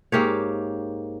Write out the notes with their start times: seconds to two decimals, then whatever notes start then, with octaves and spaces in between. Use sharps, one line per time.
0.12 G#2 A#3 G4 C#5